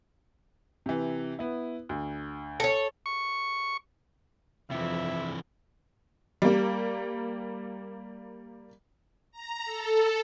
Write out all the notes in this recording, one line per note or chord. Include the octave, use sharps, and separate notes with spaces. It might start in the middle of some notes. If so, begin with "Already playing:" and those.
C3 E3
B3 E4
D2
A4 C#5
C#6
F2 C3 E3 E5
G3 A#3
A#5
A4